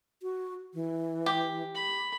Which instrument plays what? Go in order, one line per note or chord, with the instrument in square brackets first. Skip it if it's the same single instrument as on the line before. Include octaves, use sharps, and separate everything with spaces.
[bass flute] F#4
E3
[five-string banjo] G4
[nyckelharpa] B5